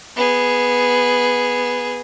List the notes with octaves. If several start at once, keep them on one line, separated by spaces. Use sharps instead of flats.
B3 G#4